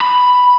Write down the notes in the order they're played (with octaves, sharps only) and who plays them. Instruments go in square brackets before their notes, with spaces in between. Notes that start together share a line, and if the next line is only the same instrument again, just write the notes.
[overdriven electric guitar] B5